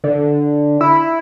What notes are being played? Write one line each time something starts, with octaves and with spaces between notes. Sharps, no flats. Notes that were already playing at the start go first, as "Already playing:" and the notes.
D3
E4